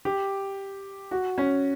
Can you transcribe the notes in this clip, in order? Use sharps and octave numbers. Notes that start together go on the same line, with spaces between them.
G4
F#4
C#4